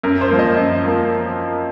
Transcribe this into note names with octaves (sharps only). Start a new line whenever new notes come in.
F#2 A#4
C5
F3 A#3
D#5
F#2
F3 A#3